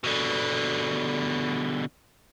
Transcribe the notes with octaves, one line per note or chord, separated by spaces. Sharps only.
B2 D3